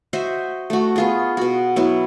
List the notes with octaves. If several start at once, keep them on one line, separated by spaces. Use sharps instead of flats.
F#4 C5 D#5 E5
A3 F#4
B3 F4 G#4
B2 F#4
F#3 B3 E4